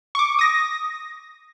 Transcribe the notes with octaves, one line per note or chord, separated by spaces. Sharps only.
C#6 D6
D#6 A#6